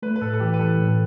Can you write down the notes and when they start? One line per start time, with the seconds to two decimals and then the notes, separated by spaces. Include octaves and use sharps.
0.02 A3 B4
0.16 B4
0.21 A2 A4
0.34 A4
0.40 E3 G4
0.54 B4
0.60 E3 A4
0.79 A2
0.88 A4